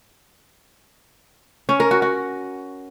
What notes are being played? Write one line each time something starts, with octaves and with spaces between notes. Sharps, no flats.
C#4
A#4
F#4
F#4